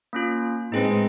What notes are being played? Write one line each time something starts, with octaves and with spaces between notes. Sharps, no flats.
A#3 C#4 F4
A2 G#3 C4 D#4 G#4 B4